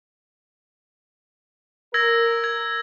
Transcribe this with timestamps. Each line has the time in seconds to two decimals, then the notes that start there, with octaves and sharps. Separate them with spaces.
1.94 A#4 E6 G#6 A#6
2.44 G#6